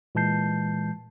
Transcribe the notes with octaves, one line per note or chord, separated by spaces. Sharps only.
A#2 E3 G#3 A5 G6 C7